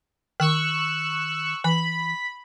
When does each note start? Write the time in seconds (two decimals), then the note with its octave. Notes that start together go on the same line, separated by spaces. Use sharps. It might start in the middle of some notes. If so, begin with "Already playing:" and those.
0.40 D#3 C#6 E6 F#6
1.64 E3 B5